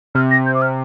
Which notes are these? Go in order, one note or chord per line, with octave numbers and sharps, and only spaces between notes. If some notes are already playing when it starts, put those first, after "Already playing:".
C3 F6
A#6
G6
D6
F6